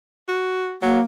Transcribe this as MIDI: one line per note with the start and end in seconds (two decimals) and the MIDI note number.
0.29 0.76 66
0.82 1.00 54
0.82 1.01 58